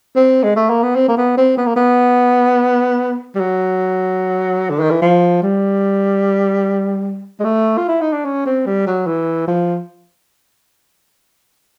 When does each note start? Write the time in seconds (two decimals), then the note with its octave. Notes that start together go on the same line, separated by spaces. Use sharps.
0.16 C4
0.43 G#3
0.56 A3
0.70 A#3
0.83 B3
0.96 C4
1.08 A#3
1.17 B3
1.37 C4
1.57 B3
1.66 A#3
1.76 B3
3.35 G3
3.40 F#3
4.70 D3
4.80 D#3
4.91 E3
5.02 F3
5.43 G3
7.40 G#3
7.44 A3
7.77 F4
7.88 E4
8.01 D#4
8.13 D4
8.25 C#4
8.46 C4
8.66 G3
8.86 F#3
9.06 E3
9.48 F3